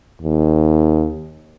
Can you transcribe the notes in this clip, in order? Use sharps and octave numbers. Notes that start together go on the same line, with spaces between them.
D#2